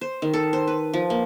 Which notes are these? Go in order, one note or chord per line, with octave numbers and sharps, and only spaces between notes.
C5
D#3
A4
C5
B4
F3
A#3